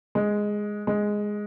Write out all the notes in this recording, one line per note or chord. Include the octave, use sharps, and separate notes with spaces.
G#3
G#3